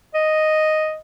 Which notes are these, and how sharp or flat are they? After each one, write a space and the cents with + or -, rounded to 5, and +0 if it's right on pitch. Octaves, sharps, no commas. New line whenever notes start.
D#5 +0